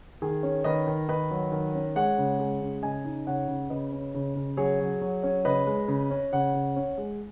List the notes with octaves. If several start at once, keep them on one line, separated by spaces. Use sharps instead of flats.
D#3 G#4
C#4
D#3 B4 D#5
D#3
D#3 B4 D#5
F#3
D#3
C#4
G#3 C#5 F#5
C#3
G#3
C#3
C#3 D#5 G#5
D#4
C#3 C#5 F#5
C#3
C#3 B4 D#5
C#4
C#3
C#3
F#3 G#4 C#5
F#3
F#3
C#4
C#3 B4 D#5
G#3
C#3
C#4
C#3 C#5 F#5
C#3
C#4
G#3